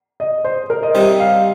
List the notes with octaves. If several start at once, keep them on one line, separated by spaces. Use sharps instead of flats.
D#5
C5
A#4
D#5
C3 G3 D#4 C5
F5